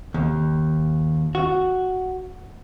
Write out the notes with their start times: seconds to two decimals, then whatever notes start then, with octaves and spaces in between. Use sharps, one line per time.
0.14 D#2
1.35 F#4